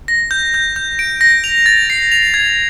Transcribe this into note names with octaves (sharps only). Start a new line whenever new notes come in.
A#6
G6
G6
G6
D7
A#6
F7
A6
C7
F7
G#6